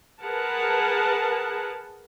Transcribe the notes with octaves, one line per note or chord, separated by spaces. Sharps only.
G#4 A#4 B4 F#5 A5